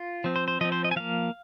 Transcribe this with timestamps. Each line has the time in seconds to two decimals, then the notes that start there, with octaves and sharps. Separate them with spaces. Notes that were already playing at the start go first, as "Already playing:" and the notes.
Already playing: F4
0.24 F3 C4
0.36 C5
0.48 C5
0.61 F3 C4 D#5
0.72 C5
0.84 D#5
0.91 G#5
0.96 F3 A#3 F5